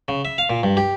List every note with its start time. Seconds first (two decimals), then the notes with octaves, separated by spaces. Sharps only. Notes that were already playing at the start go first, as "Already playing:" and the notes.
0.08 C#3
0.25 E5
0.38 F5
0.50 A#2
0.63 G2
0.77 G4